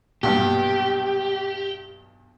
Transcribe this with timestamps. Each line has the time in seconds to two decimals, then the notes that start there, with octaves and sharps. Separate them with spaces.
0.23 B1 G2 A#2 G4